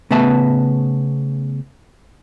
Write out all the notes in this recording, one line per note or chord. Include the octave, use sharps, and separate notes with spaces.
C#3 A3 B3 B4 E5 A5